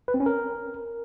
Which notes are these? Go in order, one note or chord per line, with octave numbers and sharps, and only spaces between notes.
B4
C4
C#4
A#4